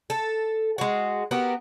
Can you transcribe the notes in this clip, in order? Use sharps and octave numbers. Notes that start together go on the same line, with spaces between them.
A4
G#3 F#4
B3 F#4 G4 A#4